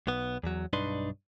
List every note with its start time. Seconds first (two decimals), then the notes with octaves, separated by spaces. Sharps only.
0.07 B1 B3
0.43 E2 F#3
0.73 B1 G2 D4 D#4 B4 C6